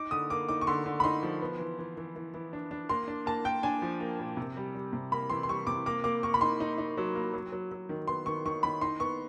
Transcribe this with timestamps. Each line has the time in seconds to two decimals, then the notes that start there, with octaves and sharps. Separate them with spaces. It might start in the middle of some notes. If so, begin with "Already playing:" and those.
Already playing: D#4 D6
0.11 D3 D#6
0.30 A#3 D6
0.48 D#4 D6
0.61 C#6
0.67 D3 C6
0.86 D3
1.00 B5
1.04 D#4 C6
1.23 F3
1.42 B3
1.59 E3
1.79 E3
1.97 E3
2.16 E3
2.34 E3
2.53 D4
2.71 D4
2.89 A#3 C6
3.08 D4
3.26 A#3 A5
3.45 A#3 G5
3.63 D4 G#5
3.82 F3
4.00 A#3
4.20 A#2
4.37 C3
4.57 G3
4.75 G3
4.93 C3
5.12 A#3 B5
5.30 E3 C6
5.43 C6
5.49 G3 C#6
5.67 C3 D6
5.86 A#3 D6
6.04 A#3 D6
6.23 A#3 C#6
6.34 B5
6.41 D#4 C6
6.60 D#4
6.78 D#4
6.97 F#3
7.15 A#3
7.33 F#3
7.52 F#3
7.72 F#3
7.89 D#3
8.08 B3 C6
8.26 D#3 C#6
8.46 D#3 C#6
8.63 D#3 B5
8.81 D#4 C6
9.00 B3 C#6